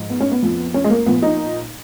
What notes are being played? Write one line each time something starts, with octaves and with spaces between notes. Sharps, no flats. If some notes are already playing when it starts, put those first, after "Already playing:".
Already playing: G#2 F3
B3
C#4
B3
F2 F3
C#4
G#3
A#3
A#2 F3 B3
D#4